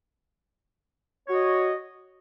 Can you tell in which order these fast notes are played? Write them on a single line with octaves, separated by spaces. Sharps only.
C#5 F#4 D#5